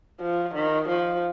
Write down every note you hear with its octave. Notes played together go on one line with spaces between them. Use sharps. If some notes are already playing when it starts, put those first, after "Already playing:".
F3
D#3
F3